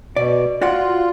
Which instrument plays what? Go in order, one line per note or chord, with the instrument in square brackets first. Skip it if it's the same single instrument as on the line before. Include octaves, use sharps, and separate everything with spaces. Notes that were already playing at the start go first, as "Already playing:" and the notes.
[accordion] B2 [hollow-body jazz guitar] D5
[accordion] F4 [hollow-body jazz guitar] F#4 D5 F#5